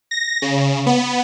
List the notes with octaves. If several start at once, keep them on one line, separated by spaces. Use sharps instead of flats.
A#6
C#3
B3